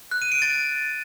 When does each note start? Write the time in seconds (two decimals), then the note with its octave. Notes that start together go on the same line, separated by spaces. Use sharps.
0.11 F#6
0.22 D#7
0.32 D7
0.42 A6